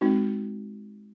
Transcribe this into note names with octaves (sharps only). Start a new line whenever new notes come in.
G#3 C4 D#4 F#4